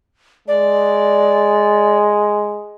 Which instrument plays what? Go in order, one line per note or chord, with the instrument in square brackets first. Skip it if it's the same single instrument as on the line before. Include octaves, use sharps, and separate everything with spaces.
[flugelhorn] G#3 [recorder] D5